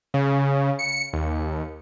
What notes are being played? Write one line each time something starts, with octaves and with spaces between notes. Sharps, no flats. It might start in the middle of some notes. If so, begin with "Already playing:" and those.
C#3
C#7
D#2